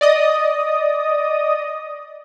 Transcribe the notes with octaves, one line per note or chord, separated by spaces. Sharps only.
D5 D#5 D#6